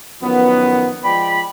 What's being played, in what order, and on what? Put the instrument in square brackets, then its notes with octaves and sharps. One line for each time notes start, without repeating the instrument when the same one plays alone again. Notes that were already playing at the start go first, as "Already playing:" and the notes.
[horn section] F#2 D#3 F3 B3
F3 G#3 D5 G5 B5